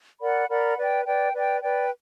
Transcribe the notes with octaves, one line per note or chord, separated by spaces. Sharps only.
A#4 D5 F#5 B5
A#4 D5 F#5 B5
B4 D5 G5
B4 D5 G5
B4 D5 G5
B4 D5 G5